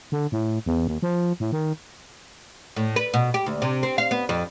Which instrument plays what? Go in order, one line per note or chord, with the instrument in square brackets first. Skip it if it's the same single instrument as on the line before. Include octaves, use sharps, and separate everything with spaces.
[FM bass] D3
A2
E2
D#2
F3
A2
D#3
[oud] A2
B4
B2
G4
D2
C3
C4
F5
B3
F2